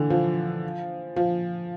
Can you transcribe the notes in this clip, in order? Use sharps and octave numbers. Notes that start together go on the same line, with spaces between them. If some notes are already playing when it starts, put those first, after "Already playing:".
Already playing: D3 E3
F3
F3